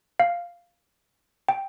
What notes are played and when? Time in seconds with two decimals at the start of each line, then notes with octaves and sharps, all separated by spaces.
0.20 F5
1.49 G5